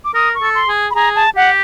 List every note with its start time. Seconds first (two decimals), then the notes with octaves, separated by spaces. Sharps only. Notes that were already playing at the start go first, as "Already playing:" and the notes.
0.05 D6
0.14 A#4 D#6
0.35 C#6
0.42 A4
0.55 C6
0.68 G#4
0.91 B5
0.95 G#4 A#5
1.16 A5
1.36 G4 F#5